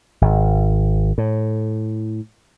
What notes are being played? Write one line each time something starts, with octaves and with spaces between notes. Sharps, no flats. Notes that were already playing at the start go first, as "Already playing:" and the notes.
G#1
A2